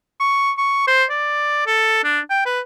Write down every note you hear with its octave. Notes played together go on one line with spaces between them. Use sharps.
C#6
C#6
C5
D5
A4
D4
G5
B4